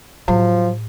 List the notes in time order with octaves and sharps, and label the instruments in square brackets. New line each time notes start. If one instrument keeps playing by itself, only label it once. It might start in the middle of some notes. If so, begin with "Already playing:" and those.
[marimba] A2 [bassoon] F3 [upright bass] F#3